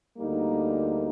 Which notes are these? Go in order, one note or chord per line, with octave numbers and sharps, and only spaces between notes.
D2 D3 G3 A#3 D#4